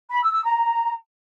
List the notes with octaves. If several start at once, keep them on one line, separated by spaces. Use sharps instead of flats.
B5
E6
E6
A#5